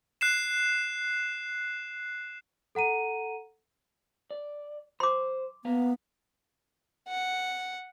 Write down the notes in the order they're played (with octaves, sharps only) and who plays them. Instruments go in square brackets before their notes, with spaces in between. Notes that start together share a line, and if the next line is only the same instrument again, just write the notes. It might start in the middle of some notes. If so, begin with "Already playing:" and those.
[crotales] F#6 C7 E7
[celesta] A4 F#5 A#5 D#7
[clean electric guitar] D5
[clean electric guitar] C5 [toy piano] C6 D6
[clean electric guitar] A#3 B4 F5 [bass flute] B3
[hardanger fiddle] F#5